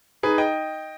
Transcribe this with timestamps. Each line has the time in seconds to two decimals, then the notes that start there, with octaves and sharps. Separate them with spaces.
0.23 D#4 G#4 B4
0.38 D#5 G5